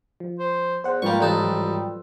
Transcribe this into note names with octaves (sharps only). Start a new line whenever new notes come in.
F3
C5
E2 C5 F#5
G#2 F3 G3 A#3 F4 B4 G5 C#6
A1 G3 D#4 A4 A5
F#3